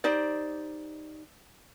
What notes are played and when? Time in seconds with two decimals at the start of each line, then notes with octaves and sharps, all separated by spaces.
0.04 D#4 G4 C5 D5